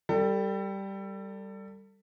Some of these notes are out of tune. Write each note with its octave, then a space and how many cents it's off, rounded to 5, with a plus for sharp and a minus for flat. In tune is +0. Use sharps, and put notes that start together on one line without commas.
G3 +0 A4 +30